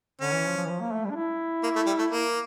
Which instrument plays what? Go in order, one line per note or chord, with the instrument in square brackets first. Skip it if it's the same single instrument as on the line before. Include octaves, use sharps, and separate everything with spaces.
[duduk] D3 [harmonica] C#4
[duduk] E3
F3
F3
E3
F3
A#3
A3
G3
D4
E4
[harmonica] A#3
A3
G3
A3
A#3